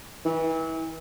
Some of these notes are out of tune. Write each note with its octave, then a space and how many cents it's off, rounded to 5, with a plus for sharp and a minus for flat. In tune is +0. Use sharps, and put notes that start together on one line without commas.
E3 -30